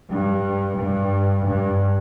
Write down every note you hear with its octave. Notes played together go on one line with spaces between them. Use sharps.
G2
G2
G2